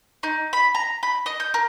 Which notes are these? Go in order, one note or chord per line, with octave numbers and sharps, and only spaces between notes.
D#4
B5
A#5
B5
D#5
G6
A#4